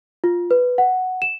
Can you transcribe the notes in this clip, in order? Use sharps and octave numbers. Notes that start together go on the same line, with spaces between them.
F4
B4
F#5
E7